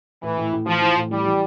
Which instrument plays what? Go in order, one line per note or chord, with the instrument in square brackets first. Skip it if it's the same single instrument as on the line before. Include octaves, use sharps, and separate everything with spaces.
[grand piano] A2 [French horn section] E3
[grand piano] A2
A2
[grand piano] E3 [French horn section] F3
[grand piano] E3
A2
[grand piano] E3 [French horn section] G3
[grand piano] E3